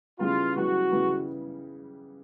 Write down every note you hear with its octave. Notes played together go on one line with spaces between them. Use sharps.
C#3 E3 G3 B3 F4
C#3 E3 G3 B3 F#4
C#3 E3 G3 B3